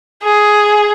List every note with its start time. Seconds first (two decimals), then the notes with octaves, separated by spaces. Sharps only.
0.23 G#4